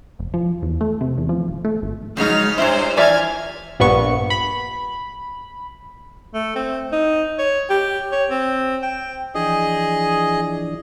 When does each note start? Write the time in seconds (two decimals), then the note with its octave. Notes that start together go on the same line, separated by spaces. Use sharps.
0.19 F1
0.34 F3
0.63 E2
0.81 A3
1.01 C3
1.18 E2
1.29 F3
1.48 D#1
1.65 A3
1.82 G#1
2.17 C#3 F3 F#3 G#3 D#4 F6
2.58 G2 E4 C5 C#5 E5
2.97 E3 F3 D#4 D5 E5 G#5 F6 G#6
3.79 A#1 G2 B3 C#6
4.30 B5
6.34 A3
6.55 C4
6.92 D#4
7.38 C#5
7.70 G4
8.12 C#5
8.30 C4
8.82 G5
9.35 E3 F3 D4 G#4 D#5